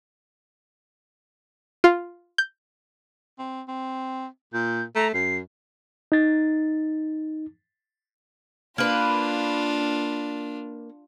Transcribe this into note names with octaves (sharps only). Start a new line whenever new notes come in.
F4
G6
C4
C4
A#2 G6
A3 A#5
F#2 C7
D#4 A6
A#3 D4 F4 B4